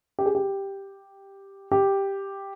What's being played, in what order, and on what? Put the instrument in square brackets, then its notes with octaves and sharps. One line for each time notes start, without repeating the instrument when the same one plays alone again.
[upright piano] G4
G#4
G4
G4